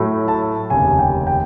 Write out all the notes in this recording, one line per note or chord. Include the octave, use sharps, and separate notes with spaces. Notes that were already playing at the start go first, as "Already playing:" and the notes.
Already playing: A2 F#3 A3
A5
F1 D#2 C#3 G#5
G5
G5